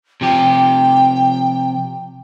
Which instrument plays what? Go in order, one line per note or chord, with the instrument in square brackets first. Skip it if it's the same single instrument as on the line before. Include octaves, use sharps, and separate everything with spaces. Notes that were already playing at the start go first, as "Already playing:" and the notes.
[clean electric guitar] C3 F3 G4 [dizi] G5